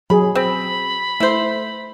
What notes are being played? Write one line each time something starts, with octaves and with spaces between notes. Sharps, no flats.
F#3 G#4 B5
C4 B5
A3 E4 C5